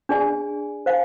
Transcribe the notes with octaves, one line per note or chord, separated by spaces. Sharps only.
D4 G#4 D5 G#5
C5 F5 G#5